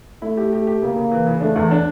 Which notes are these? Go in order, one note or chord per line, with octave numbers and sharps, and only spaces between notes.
A3 E4
G4
G4
G4
C#3 A#3
C#3
E3
C#3
A3 D4
E2
D4